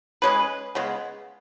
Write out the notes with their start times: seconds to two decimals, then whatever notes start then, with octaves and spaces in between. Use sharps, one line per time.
0.22 G#3 C#4 G#4 B4
0.75 C#3 G#3 B3